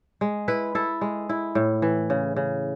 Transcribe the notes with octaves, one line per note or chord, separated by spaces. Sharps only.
G#3
E4 B4
E4 A4
G#3
E4
A2
E3
C#3
C#3